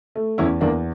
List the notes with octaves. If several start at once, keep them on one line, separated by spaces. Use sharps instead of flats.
A3
E2 C#4 E4
E2 A#3 D4